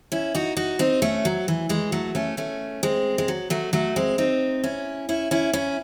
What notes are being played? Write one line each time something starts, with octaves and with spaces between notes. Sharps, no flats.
C#4 E4
D#4 F#4
D#4 F#4
C4 D#4
A3 C#4
F#3
E3
E3 G#3
F#3 A3
A3 C#4
A3 C#4
G#3 C4
G#3
F#3
F#3 A3
F#3 A3
G#3 C4
C4 D#4
C#4 E4
C#4 E4
C#4 E4
C#4 E4